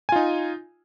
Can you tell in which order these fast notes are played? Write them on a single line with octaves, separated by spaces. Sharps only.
G#5 F4 D#4